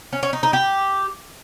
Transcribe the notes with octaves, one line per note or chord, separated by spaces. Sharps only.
C#4
C#4
D#4
D#4
G4